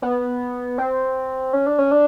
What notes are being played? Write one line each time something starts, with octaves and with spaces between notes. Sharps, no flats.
B3
C4
C#4
D4
C#4
D4